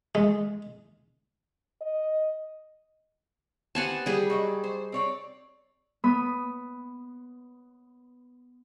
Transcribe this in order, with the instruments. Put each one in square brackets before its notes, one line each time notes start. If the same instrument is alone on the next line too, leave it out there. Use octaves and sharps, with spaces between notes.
[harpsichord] G#3
[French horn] D#5
[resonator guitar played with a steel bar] B3 C4 G4 [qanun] F#5 G#5 A5
[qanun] G3 G#4
[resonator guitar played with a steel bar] F#3 D5 D#5
C5
C4 C#5 D5
[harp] B3 B5 D#6